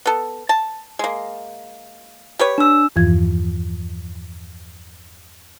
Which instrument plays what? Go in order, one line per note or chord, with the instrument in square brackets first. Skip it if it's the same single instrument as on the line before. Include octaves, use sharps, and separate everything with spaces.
[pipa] B3 A4
A5
G#3 A#3
G4 B4 C#5
[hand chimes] D4 E6
[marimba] E2 G2 E3 F3 F4 G#6